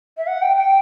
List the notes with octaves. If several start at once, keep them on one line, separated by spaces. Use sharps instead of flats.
E5
F#5
G5
G5